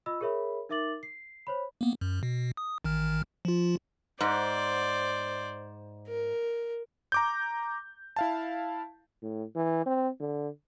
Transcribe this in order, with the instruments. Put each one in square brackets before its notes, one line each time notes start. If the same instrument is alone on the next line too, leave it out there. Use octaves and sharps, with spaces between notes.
[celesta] F4 D#5 B5 E6
G#4 A#4 C#5 E5 B5
D#4 A#4 E5 D6 A6 F#7
C7
C5 C#5 B5
[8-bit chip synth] A#3 B3
F#2
B2
D#6
A1 D#3 F6
F3 F4
[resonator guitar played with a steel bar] G#2 [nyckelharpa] C5 D5
[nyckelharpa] A#4
[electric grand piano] A#5 D6 G6
E4 F5 A5
[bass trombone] A2
E3
C4
D3